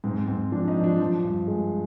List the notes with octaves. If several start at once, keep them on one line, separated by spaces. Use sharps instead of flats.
G#2 C4
G#2 C4
F3 D4
D#4
F3
D4
F3
G2
G#3